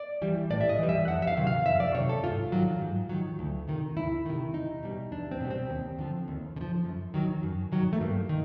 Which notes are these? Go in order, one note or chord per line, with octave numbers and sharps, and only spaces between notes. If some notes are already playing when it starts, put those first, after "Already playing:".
Already playing: D5
E3 G3
A2 D5
E5
D#5
E3 G3
E5
F2 F#5
E5
F5
C3 D#3 F#3
F5
F2 E5
D5
C3 D#3 F#3 C#5
A4
G#2 F4
D#3 F#3
G#2
D#3 F#3
D2
C3 D#3
D2 E4
C3 D#3
E2 D#4
B2 G3
E2 D4
C4
B2 G3
C4
D#2
D3 F3
D#2
D3
F3
F#2
D#3 F#3
F#2
D#3 F#3
A3
G2 A#3
D#3